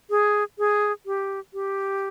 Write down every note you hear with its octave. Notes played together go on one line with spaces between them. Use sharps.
G#4
G#4
G4
G4